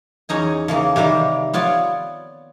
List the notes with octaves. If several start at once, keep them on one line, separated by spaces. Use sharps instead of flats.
E2 C#4 D#4 G#5
C#3 E3 A#3
C3 D#3 G3 A#3
B3 F4 C#5 D5